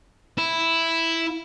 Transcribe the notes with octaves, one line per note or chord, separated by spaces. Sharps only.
E4